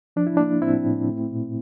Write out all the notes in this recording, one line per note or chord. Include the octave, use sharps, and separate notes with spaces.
F3 D4
E4
A#3 D4
A2 C4 E4
A2
A3
A#2